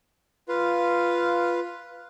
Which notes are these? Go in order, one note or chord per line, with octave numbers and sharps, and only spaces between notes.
F4 B4 F5